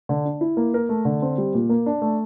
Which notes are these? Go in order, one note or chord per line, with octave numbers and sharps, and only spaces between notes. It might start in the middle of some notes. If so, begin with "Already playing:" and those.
D3
D4
E4
A#3
A#4
A3
D3
C4
G3
A#2
A#3
D4
A3